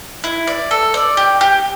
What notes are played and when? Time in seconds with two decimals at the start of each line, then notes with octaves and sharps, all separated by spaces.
0.24 E4
0.47 D5
0.71 A4
0.94 D5
1.17 G4
1.41 G4